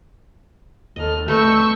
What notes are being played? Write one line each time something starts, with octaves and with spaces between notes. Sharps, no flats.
D#2 A4 D#5 F6
A3 B4 D#5 C#6 E6 G6